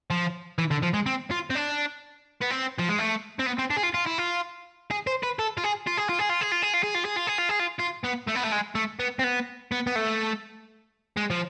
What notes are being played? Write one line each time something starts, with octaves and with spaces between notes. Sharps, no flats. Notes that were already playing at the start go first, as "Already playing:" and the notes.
F3
E3
D3
F3
G#3
C4
F4
C4
D4
B3
C4
F3
G#3
A3
C4
B3
C4
D4
G#4
F4
F4
E4
F4
G#4
C5
B4
A4
F4
G#4
F4
G#4
F4
G#4
F4
G#4
F4
G#4
F4
G#4
F4
G#4
F4
G#4
F4
G#4
F4
F4
B3
A3
B3
A3
G#3
A3
B3
C4
B3
B3
B3
A3
G#3
F3